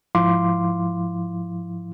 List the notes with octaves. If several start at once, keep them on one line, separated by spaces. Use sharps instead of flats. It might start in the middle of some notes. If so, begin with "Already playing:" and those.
G#2 F3 E4 F5 C6 D6